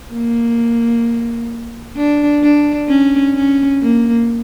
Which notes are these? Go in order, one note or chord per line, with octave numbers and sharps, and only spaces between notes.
A#3
D4
D4
C#4
C#4
A#3